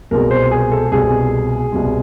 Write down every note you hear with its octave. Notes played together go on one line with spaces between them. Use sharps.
C2 B2 G#3 A#4
C5
G#4
A4
C2 B2 G#3 G#4
C2 B2 G#3